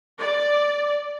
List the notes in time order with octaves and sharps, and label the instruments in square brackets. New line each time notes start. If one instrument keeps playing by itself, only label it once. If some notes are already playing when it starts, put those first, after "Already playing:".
[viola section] D5